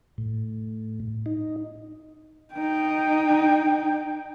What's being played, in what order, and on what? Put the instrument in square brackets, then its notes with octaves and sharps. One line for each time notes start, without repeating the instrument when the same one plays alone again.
[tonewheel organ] A2
D#4
[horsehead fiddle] D#4 G5